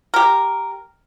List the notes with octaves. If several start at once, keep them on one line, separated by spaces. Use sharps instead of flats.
G4 A#4